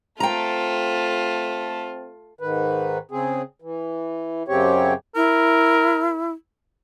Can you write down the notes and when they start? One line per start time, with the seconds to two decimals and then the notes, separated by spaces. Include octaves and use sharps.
0.20 A3 C4 F4 A4 G5 A#5
2.40 G#2 D#3 B4
3.11 C#3 C4 G#4
3.62 E3
4.48 F#2 C#3 C4 G4 C#5
5.16 E4 A#4